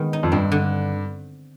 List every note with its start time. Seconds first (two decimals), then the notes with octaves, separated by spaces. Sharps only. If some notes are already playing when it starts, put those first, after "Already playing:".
Already playing: D#3 G#3 B3
0.13 D#4
0.23 F2
0.32 G2 C4
0.52 D3